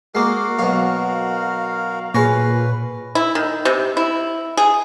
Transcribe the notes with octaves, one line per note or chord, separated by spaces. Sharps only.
G#3 A#3 F#4 A#4 C7
F#2 B2 F5
A#2 G#4 B4 C#5 F5 G#5 A#6
E4
D#3
C3
E4
G#4